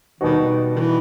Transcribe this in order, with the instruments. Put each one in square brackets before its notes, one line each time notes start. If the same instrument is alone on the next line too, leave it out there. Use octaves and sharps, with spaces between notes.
[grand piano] B2 G3 B3 D#4 F#4 [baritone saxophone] D#3
[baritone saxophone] D#3
E3